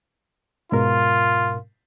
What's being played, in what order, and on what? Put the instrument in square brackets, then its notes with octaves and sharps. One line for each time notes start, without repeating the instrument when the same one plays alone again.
[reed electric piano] G#2 B2 A#4 [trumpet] F4